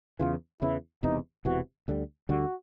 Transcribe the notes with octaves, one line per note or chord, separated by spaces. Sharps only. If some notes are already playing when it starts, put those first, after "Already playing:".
E2 C#3 E3 F4
E2 C#3 E3 E4
E1 E2 C3 E3 D#4
E1 E2 C3 E3 F#4
D2 D3 G3
D2 D3 G3 F#4